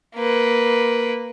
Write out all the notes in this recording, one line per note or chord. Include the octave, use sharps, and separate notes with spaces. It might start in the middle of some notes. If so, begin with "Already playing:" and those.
A#3 B4